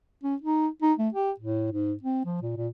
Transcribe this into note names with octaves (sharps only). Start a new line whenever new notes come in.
C#4
D#4
D#4
A3
G4
A2
G#2
C4
F3
A#2
A#2